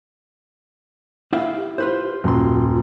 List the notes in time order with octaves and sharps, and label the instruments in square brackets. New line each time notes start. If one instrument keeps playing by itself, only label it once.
[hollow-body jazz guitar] E4 E5 F5
[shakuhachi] G4
[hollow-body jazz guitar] F4 B4 C5
[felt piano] D#1 [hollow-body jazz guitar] F#2 C6 [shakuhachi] F4